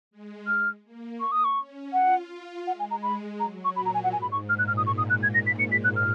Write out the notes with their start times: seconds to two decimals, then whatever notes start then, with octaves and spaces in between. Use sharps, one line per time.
0.11 G#3
0.47 F6
0.84 A#3
1.20 C#6
1.32 D#6
1.45 C#6
1.56 C#4
1.93 F4 F#5
2.67 G#3 F#5
2.79 G#5
2.91 A#5
3.03 B5
3.39 F#3 A#5
3.65 C#6
3.76 A#2 B5
3.86 A#5
3.94 G#5
4.04 F#5
4.12 G#2 G#5
4.22 B5
4.32 C#6
4.49 A#2 F6
4.59 F#6
4.68 F6
4.77 D#6
4.87 C#6
4.98 D#6
5.10 F#6
5.23 G#6
5.34 A#6
5.47 B6
5.59 C#7
5.72 B6
5.84 F#6
5.96 F6